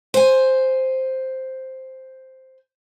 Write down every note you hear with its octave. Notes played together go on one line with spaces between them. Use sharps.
C5 G#5